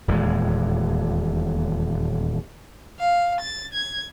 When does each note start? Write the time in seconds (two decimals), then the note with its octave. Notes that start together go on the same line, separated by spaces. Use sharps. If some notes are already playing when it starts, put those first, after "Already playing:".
0.08 D#1 E2 A#2 G#3
2.99 F5
3.40 A6
3.73 G#6